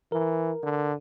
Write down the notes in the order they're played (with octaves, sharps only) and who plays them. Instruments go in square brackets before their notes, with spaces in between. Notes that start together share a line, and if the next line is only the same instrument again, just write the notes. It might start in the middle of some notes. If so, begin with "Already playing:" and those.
[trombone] E3 [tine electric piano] A#4
[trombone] D3